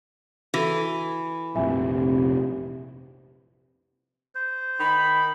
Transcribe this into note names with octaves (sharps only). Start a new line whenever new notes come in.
E3 F#4 A4
F1 A#1 C3 E5 G#5
C5
D#3 B5